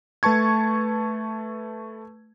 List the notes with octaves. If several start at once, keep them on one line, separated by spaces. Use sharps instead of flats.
A3 B4 A5 C#6 G#6